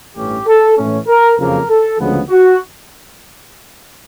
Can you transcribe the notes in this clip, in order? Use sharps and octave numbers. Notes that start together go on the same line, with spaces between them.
A1 G2 E3 A3 C#4 G4
A4
A2 E3 A3 C#4
A#4
F#1 F2 C#3 F3 A#3 A#4
A4
D2 C#3 F3 G#3 B3
F#4